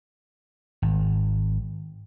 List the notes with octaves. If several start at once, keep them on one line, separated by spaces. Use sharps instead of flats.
G#1